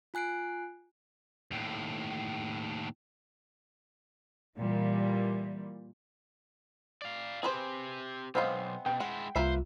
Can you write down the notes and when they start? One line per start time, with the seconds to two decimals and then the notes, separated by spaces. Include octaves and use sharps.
0.14 F4 G#5 F#6 C7 D7
1.51 D#2 A2
4.56 A#2 E3 G3
7.02 D5 F5
7.43 C4 G4 G#4 B4 C5
8.35 B1 G#3 B3 C4 C5 F5
8.86 B2 G5
9.00 G#3 E4 F#5
9.36 C2 A#3 F4 B4 C5 E5